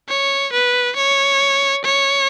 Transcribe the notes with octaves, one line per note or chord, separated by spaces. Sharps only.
C#5
B4
C#5
C#5